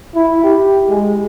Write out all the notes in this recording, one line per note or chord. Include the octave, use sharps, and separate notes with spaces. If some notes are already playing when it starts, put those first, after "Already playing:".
E4
G4
G#3